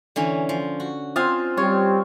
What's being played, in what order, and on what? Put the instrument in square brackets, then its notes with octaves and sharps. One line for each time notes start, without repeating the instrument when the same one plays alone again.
[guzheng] D3 E3 C#4
F3
F#4
[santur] C4 F4 D#6 [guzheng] D#5 F5 G#5
[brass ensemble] G3 C4 [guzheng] F4 [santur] C#5